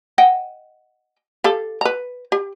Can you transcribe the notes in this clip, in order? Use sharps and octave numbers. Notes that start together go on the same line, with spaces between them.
D#5 F#5 G5
G4 A4 F5
B4 A#5
G4